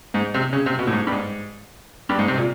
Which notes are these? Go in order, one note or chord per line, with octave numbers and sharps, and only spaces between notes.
G#2
C3
C#3
C3
B2
A2
G#2
G2
G#2
G2
G#2
C3
A#2